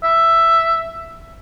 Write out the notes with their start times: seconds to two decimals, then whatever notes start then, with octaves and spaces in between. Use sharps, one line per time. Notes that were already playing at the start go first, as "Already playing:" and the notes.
0.04 E5